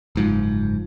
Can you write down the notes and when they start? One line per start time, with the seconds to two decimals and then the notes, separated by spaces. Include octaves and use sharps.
0.16 F#1 G#2 F3